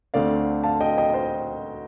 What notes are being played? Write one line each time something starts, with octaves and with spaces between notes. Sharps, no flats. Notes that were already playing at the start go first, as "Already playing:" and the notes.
D2 D3 A3 C4 D5 F5
F5 A5
D#5 G5
D#5 G5
C5 D#5